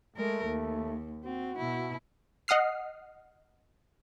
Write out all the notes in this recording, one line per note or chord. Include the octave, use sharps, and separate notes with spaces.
G#3 A3 A#4
D#2
C4 F#4
B2 E4
D#5 F#5 D#6 F6 C7